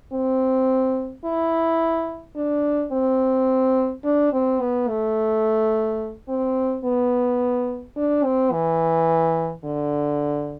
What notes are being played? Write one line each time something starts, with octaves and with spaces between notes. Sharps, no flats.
C4
E4
D4
C4
D4
C4
B3
A3
C4
B3
D4
C4
E3
D3